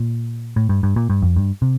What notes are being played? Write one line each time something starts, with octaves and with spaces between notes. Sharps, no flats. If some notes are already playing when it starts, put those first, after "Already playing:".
Already playing: A#2
A2
G2
G2
A#2
G2
F2
G2
C3